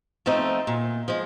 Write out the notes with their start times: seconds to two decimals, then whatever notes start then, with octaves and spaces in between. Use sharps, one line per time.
0.26 F3 A3 C4 D#4
0.67 A#2
1.08 F3 G#3